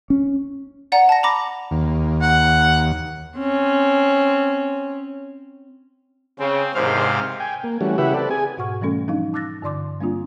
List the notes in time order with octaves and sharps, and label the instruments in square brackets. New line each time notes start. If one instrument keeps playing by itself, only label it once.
[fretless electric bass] C#4
[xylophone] D5 F#5 A#5
A5 A#6
A#5 B5 D6 A#6
[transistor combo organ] D#2
[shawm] F#5
[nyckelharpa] C4 C#4
[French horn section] C#3 [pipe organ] C4
[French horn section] E2 D#3 C5 [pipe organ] G#2 C3 F5
[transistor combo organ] G5 G#5
A#3
E3 G3 A3 C#4 F#4
C#3 E4 G4 B4 E5 F#5
C4 A4 B4 D5
G#4 G#5
[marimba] G#2 B2 F#4 F#5 C#6 F6
E3 G3 A3 C#4 A4
F3 G3 D4 D#4 F5
A5 D6 E6 F#6 A6 A#6
G2 D3 D5 C6 D6
G3 A#3 C4 D4 F4